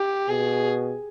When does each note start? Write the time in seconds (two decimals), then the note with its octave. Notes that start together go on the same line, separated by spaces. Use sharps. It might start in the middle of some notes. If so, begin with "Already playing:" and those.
Already playing: G4
0.29 B2 G#4